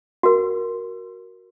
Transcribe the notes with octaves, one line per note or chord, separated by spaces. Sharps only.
F#4 A#4